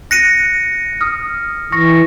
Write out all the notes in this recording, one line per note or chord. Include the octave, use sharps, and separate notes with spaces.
F#6 A#6 C#7 D#7
D#6 F6
E3 C#6 A#6 C#7